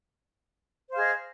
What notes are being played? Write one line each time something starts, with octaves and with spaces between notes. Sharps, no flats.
G#4 C5 D#5 F5